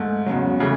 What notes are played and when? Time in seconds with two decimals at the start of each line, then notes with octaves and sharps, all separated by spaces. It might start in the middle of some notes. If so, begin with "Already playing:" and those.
Already playing: G#2 A3
0.26 E2 C#3 F#3
0.60 C#3 E3 A3 E4